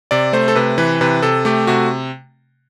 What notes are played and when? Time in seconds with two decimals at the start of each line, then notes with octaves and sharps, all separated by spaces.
0.11 C3 D5
0.33 A3 C5
0.48 A4
0.56 C3 B4
0.78 E3 B4
1.01 C3 B4
1.23 C3 A4
1.45 A3 G4
1.67 C3 F#4